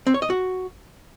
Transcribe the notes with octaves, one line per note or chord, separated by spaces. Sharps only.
C4
C#5
D#5
F#4